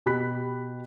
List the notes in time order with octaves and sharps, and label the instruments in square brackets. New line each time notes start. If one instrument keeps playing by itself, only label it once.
[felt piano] B2 G4 B5 F#6 B6